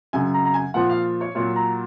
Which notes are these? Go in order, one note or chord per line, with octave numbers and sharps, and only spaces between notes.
F#2 C#3 F#3 G#5
A#5
A#5
G#5
A#2 F3 F#5
F5
C#5
A#2 F#3 C#5
A#5